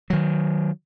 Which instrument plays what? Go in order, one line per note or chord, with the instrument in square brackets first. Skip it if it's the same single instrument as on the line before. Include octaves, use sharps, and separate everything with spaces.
[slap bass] D#3 F#3